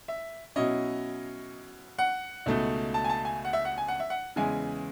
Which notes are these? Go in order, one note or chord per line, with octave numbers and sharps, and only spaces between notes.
E5
B2 F#3 C#4 E4 D#5
F#5
C#2 B2 A3 D#4
A5
G#5
A5
G#5
F#5
E5
F#5
G#5
F#5
E5
F#5
E2 C#3 E3 G#3 G#5